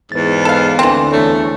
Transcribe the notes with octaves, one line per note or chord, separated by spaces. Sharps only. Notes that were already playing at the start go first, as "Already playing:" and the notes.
E2 G#2 B4 A6
A4 F5
D2 D3 E3 C4
E2 A3 D4 C#5